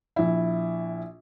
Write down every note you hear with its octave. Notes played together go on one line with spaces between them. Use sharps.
A#1 E4